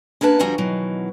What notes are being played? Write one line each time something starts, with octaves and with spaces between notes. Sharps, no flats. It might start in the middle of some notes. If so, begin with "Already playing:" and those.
A#3 C#4 D4 B4 A5
D2 F3 G3 F#4 G#5 A#5
B2 D#3 E3 F#3